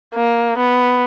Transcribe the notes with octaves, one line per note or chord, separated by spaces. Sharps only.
A#3
B3